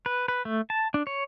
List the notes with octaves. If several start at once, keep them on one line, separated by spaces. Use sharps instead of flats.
B4
B4
A3
A5
D4
C#5